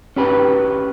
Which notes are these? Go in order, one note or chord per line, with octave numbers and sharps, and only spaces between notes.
C#4 G4 B4